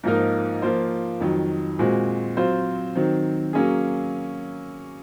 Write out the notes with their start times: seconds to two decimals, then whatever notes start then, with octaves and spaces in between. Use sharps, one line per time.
0.03 G#2 F3 A#3 D#4 A#4
0.62 F3 A#3 F4 C5
1.20 F2 D#3 F#3
1.79 A#2 G#3 C4 F#4
2.37 F#3 C4 F4 C5
2.95 D#3 F#3 C4
3.53 F#3 A#3 C#4 G#4